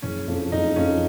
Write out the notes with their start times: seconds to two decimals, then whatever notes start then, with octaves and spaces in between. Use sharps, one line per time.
0.02 F#1 C#4
0.27 F2 F3
0.52 F#1 D#4
0.76 F2 F3 C#4